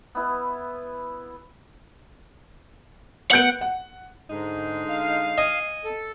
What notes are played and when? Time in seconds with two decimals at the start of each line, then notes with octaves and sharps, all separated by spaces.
0.15 B3 E4 B4
3.32 B3 F#5 G6 D7
3.61 F#5
4.30 G#2 D3 G#3 D#4
4.89 F5
5.38 D#5 G#5
5.85 A4